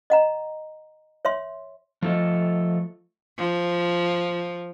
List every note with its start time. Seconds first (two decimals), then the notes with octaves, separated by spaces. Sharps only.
0.10 D#5 F#5 A#5
1.25 C#5 E5 C6
2.02 F3 A3 F4 A4 D#5
3.38 F3